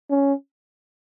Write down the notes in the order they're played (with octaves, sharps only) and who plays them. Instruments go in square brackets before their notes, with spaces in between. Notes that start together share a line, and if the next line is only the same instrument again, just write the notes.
[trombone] C#4